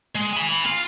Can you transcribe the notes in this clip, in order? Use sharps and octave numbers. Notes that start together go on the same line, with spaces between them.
G#3
G#5 B5
F4